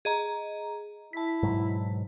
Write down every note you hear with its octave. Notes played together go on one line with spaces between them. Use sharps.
G#4 D#5 A#5
E4 A5 B6
G#2 B2 F#3